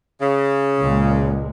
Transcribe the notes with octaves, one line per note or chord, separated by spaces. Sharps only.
C#3
C#2 A#2 G#3